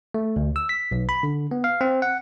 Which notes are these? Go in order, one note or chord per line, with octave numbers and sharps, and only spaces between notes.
A3
D2
E6
B6
B1
B5
D3
B3
F5
C4
F#5